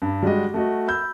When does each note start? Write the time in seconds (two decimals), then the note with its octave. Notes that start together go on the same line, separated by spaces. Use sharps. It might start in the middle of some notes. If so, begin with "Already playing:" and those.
0.02 G2
0.23 G3 G#3 F#4 D#5
0.54 A3 F#4 D#5
0.88 B5 E6 G6